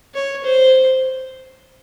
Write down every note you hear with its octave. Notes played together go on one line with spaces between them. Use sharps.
C#5
C5